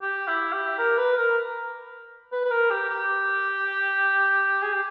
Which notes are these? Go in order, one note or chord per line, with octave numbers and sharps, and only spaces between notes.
G4
E4
G4
A#4
B4
A#4
B4
B4
A#4
G4
G4
G#4
G4